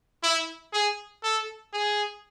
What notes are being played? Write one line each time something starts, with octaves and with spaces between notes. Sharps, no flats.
E4
G#4
A4
G#4